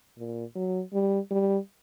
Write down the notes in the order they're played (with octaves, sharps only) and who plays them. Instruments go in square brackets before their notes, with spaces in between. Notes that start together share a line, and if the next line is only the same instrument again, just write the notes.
[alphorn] A#2
F#3
G3
G3